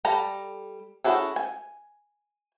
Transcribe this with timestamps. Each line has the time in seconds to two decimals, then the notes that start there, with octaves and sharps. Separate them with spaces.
0.05 G3 A4 A#5
1.04 C#4 E4 F#4 G#4 A4
1.36 G#5